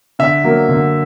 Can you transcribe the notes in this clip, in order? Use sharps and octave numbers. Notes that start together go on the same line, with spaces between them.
D3 E5
F#3 A#3
D3